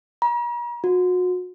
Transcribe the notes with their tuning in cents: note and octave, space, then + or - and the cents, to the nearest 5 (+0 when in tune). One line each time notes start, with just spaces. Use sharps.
A#5 +45
F#4 -35